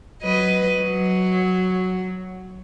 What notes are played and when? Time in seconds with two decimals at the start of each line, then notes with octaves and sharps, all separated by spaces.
0.23 F#3 B4 D#5
0.81 F#3